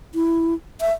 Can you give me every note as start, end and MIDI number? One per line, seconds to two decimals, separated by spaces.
0.15 0.54 64
0.81 0.93 76